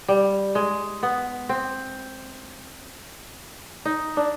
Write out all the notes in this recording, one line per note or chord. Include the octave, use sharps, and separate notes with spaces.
G3
G#3
B3
C4
D#4
D4